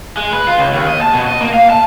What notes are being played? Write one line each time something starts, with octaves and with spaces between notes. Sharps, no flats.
G#3
B4
F4
C#2
D#2
D#5
A5
B2
D#5
A#3
F5
A5